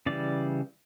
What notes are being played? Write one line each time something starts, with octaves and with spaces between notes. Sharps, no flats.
C#3 E3 G3 D5